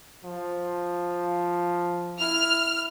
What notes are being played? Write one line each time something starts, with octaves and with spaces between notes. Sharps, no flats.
F3
E4 F6